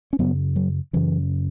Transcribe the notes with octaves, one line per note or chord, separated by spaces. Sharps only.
C#4
F#2 C#3 F#3 B3
F#3
F#2 C#3 E3